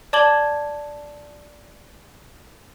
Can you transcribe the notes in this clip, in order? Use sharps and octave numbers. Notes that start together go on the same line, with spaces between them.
D5 A5 D6 G#6 F#7 G7